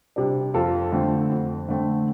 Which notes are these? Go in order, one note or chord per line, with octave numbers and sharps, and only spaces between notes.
C3 G3 D4
F2 F4 A4
D3 A3 C4
F2
D3 A3 C4